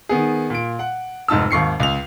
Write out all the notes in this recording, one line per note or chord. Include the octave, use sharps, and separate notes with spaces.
D#3 B3 G#4
A#2 D7
F#5
F1 G#2 D#4 A5 E6
G#1 D#2 C#6 C7 C#7
C#2 F7